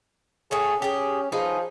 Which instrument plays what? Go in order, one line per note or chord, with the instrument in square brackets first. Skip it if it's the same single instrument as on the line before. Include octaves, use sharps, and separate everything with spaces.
[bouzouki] A2 A3 C#5 [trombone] G#4
[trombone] C#4 [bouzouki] G4 G#4
[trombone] F3 [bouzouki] D#4 G#4 B4